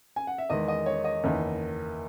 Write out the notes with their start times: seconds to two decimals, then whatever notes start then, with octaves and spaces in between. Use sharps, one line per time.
0.16 G#5
0.27 F#5
0.38 E5
0.50 E2 D#3 G#3 D#5
0.68 D#5
0.86 C#5
1.04 D#5
1.24 F#1 E2 D#3